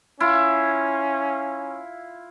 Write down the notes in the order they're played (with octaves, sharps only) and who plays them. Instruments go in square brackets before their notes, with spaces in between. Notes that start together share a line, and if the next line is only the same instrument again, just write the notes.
[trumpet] C#4 [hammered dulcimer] E4 F4